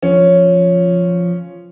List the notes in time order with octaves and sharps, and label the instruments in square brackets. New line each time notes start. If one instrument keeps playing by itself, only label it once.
[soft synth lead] F3 [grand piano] C#4